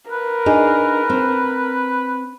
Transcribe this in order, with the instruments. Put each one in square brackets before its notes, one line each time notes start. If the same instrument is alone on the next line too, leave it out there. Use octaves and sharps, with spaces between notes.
[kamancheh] A#4 [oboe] B4
[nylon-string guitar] D4 D#4 G#4
C4